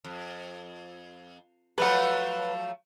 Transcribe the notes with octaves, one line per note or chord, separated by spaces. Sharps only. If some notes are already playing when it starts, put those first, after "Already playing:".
F2
F3 F#3 A3 B4 F#5